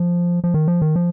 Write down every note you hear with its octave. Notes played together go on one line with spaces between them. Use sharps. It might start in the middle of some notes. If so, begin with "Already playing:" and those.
Already playing: F3
F3
D#3
F3
D#3
F3